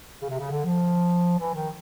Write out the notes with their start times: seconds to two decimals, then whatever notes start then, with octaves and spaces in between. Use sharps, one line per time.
0.22 C#3
0.30 C3
0.39 C#3
0.50 D3
0.65 F3
1.39 E3
1.53 D#3